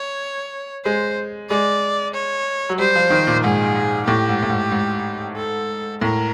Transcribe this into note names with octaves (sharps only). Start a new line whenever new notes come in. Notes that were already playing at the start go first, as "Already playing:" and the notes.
Already playing: C#5
G#3 C5
G#3 D5
C#5
F#3
G3 C5
F3
D#3
A#2
G#2 G#4
A2 G4
G#2
A2
G#2
G#2
A4
A2 A#4